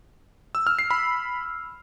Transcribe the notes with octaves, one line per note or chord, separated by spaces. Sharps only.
E6
F6
C7
B5